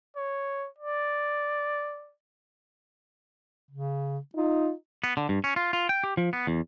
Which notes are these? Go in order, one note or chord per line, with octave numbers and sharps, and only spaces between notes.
C#5
D5
C#3
D#4 F4
B3
D3
G2
C#4
F4
F4
G5
G4
F3
B3
E2